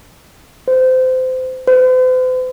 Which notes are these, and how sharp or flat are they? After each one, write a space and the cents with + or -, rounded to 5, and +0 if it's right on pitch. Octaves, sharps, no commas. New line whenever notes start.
C5 -25
C5 -45